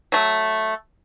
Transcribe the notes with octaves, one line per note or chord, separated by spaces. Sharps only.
F#3 A3